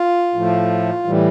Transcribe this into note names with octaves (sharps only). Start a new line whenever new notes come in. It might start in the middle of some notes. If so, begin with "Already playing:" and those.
Already playing: F4
A2 F3 A3
A2 E3 G3